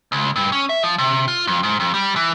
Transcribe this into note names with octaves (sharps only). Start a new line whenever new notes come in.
C#2
G2
C#4
E5
F3
C3
F4
F2
G#2
F2
G3
E3